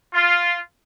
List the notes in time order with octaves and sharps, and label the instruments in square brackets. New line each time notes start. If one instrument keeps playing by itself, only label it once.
[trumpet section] F4